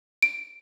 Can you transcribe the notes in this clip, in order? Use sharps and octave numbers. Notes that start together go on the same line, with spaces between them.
D7